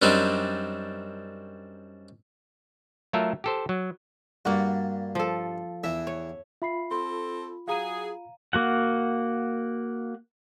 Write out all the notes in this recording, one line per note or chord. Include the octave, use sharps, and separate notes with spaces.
F#2 G3 C4 D4 D#4
F#3 A3 F4 A4 A#4 E5
G4 A4 C5
F#3
G2 A#3 F#4
F3 A4
E2 E3 E5
C#5
F4 E5 B5 C7
C4 A4 C6
F#3 G#4 F5 A#5 D#7
A#3 F#4 F#5